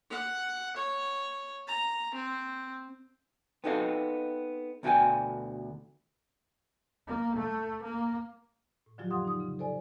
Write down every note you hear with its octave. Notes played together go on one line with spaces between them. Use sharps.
F#5
C#5
A#5
C4
B3 C4 D#4 A4 D#5 F5
D2 B2 E4 F#4 G5 G#5
A#3
A3
A#3
A2
D3 F3 F#3 F4 G4
F2 D3 F5 F#5 C6 D#6
D#4 D#6
C#3
A4 C5 D5 G#5